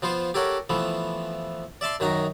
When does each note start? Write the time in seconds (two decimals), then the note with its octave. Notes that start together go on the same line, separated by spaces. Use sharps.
0.02 F3 B3 F4 C5
0.34 G4 A4 A#4 C#5 F#5
0.69 E3 F3 A3 B3
1.81 D5 E5 A5 C6
2.00 F#2 D#3 D#4 F#4 A#5